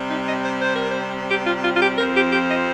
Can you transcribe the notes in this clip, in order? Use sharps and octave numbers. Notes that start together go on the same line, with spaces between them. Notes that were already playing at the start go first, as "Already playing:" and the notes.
Already playing: C3 G3 C4
D#4
D#5
C5
C5
A#4
C5
G4
F4
F4
F4
G4
F2 F3 C4 A#4
G4
G4
D#5